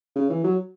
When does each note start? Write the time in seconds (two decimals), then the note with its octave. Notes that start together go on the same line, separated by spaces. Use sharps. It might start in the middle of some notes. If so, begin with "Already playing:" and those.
0.16 C#3
0.30 E3
0.44 F#3